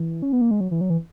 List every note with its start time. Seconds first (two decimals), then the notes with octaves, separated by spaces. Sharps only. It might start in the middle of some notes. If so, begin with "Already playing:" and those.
Already playing: E3
0.22 C#4
0.32 B3
0.41 A#3
0.51 G#3
0.60 F#3
0.71 E3
0.81 F#3
0.90 E3